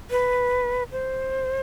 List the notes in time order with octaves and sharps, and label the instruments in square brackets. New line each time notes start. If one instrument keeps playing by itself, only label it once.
[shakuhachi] B4
C5